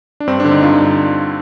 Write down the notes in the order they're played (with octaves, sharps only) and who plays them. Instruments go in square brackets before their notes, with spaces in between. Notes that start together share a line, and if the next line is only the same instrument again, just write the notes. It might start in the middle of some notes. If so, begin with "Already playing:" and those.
[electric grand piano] D4
G2 C4
D4
D3
D#4
G2 F4